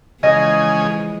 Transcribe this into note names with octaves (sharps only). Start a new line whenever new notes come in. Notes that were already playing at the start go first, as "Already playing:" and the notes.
C#3 E3 F3 G#3 G#4 D#5 D#6